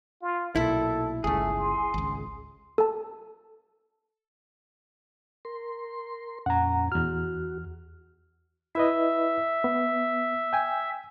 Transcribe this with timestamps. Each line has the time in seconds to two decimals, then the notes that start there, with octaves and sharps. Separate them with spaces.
0.22 F4
0.56 B1 A#2 E4 A4
1.24 G1 C#2 A3 G#4
1.58 C6
1.94 G#1 C#2
2.78 A4 A5
5.45 A#4 C6
6.46 F2 A#2 C#4 F#5 A#5
6.92 E2 F#4 F6
8.75 E4 B4 D#5 E5
9.64 B3
10.53 G5 G#5